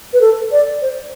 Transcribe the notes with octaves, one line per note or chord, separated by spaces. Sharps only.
B4
A4
D5
C5